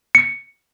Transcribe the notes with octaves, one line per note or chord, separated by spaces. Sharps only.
C#7